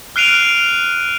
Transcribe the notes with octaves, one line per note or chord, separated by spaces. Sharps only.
F6 F#6 C7 D7 D#7 F7